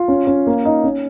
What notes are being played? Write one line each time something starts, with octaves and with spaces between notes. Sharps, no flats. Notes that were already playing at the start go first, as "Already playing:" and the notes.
Already playing: F4
C#4
C#4
A#3
D#4
C#4